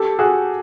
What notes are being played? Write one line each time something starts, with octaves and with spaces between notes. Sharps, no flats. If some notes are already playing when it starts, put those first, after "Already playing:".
Already playing: G4 A4
F#4 G#4